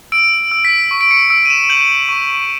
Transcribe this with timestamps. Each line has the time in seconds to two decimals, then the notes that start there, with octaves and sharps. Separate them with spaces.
0.12 E6 D7
0.51 E6
0.65 B6
0.91 C#6
1.01 D7
1.11 C#7
1.30 E6 D7
1.45 D#7
1.50 E7
1.70 G6 F#7
2.09 C#6